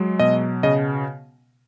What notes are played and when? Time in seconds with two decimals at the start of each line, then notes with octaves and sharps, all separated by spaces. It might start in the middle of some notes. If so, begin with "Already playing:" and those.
Already playing: F#3 G#3
0.19 B2 D#5
0.63 C#3 D#5